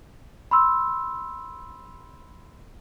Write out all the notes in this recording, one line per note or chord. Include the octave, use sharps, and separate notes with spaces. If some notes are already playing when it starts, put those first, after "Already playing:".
B5 C6 E6